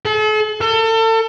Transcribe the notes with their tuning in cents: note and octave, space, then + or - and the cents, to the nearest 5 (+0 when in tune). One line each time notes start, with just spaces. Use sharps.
A4 -45
A4 +35